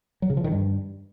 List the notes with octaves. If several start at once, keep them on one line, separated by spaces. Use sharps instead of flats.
F#3
C#3
F3
D#3
G2